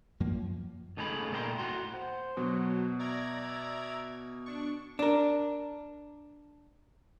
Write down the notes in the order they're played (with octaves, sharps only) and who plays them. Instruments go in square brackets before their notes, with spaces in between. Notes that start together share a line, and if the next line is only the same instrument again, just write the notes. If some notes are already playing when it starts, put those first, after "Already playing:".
[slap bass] F#2 F3 A#3
[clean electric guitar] C#2 A3 D#4 G#4 A#5 B5
A#2 A3 A#4 G5 C6
A2 F#4 C6
[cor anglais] C5 [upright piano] F#5
[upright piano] B2 [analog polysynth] F#3
[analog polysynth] D5 A#5 G#6 [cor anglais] E5
[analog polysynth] D4 C#6
[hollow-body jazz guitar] D4 A#4